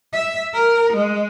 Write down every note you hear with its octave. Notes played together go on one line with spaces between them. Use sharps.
E5
A#4
G#3